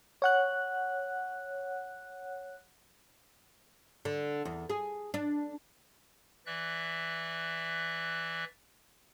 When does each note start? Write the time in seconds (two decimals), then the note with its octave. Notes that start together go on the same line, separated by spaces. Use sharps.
0.22 C#5 F#5 F#6
4.05 D3
4.45 E2
4.70 G#4
5.14 D4
6.46 E3 D5 E5 F#6